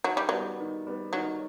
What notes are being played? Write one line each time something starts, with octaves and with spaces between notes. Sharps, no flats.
D#3 F#3
G3
F#3 G3 B3
D#3
G3 B3
D#3 F#3